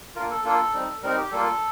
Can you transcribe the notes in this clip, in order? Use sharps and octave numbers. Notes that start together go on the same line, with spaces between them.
A#3 D4 F4 A#4
A4
A#3 D4 F4 A4
G3 C4 D#4
G3 C4 D#4 A#4
G4
G3 A#3 F4 A4